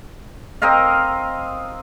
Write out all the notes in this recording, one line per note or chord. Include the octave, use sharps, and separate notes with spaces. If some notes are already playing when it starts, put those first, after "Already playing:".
C4 A#4 D#5 F5